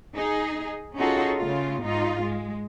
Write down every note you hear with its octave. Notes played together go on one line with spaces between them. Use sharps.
D#4 G#4
C#4 D#4 F4 F#4 G#4 A4
C#3 A3 F4
G#2 D#4 F4
G#3